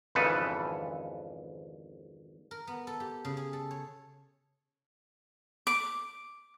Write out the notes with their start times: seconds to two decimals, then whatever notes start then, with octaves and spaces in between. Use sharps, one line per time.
0.15 G#1 F2 C#3 E3 A4 B4
2.51 A#4
2.67 B3
2.87 A4
3.00 G4
3.25 C#3
3.37 G#4
3.53 A4
3.71 C#5
5.67 D6